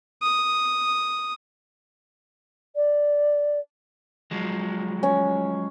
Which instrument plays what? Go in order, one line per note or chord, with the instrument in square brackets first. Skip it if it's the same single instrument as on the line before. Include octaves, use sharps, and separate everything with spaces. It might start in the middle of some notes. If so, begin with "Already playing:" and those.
[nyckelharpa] D#6
[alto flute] D5
[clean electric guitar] F3 F#3 G#3
[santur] C#4